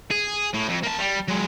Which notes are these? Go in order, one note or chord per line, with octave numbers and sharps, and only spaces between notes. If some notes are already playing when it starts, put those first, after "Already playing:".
G#4
A2
F2
A#3 A5
G3
F#3 G#3